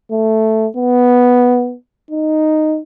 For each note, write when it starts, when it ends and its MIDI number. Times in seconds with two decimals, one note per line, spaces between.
0.11 0.67 57
0.77 1.75 59
2.11 2.80 63